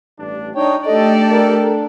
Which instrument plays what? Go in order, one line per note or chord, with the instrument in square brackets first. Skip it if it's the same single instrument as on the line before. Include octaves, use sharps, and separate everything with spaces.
[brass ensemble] A1 G2 D4
[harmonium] D4 C#5 G5 [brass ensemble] D#4
[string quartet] A3 G4 D5 [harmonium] D4 [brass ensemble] A4 [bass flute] D#5
[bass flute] A#4